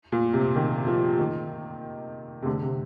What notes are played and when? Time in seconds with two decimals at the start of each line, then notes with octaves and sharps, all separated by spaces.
0.12 A#2
0.33 C3
0.56 D#3
0.87 F3
1.19 D#3
2.42 C3
2.46 D3
2.62 C3